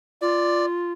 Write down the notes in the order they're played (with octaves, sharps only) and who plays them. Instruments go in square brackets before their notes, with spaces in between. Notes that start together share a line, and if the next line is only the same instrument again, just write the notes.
[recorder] F4 [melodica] D5